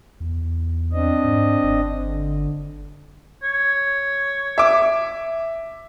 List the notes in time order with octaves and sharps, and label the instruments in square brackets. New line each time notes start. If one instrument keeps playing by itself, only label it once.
[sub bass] E2
[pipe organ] C4 D4 D#5
[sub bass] G#2
G1
[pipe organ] D3
[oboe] C#5
[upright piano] E5 D6